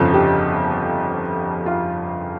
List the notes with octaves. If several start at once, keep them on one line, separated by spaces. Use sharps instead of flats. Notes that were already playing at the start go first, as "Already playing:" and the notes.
Already playing: G1 F2 C#3 F3 A4
G4
F4